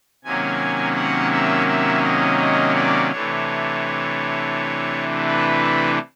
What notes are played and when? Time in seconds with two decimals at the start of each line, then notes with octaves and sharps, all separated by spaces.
0.24 C3 D#3 F#3 A#3 C#4 G#5
0.96 F#5
1.32 E5
1.67 E5
2.03 D#5
2.39 D#5
2.75 D5
3.11 C3 E3 A3 D4 C#5
5.27 B4